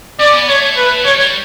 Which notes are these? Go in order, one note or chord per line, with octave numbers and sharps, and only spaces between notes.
C#4 D5
B3
A3 C#5
B4
F#3
G3 C#5
G3